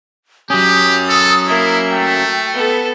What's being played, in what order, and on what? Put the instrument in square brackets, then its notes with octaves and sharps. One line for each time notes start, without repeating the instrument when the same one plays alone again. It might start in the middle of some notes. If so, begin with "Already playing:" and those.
[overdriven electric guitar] F#3 C#4 [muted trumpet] G4 [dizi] D#6
[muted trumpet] A4
[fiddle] A#3 E5 [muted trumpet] E4
[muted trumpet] A3 [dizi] G5
[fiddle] B3 A4